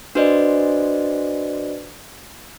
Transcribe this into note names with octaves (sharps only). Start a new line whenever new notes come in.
D4 F#4 B4 C5 D5 D#5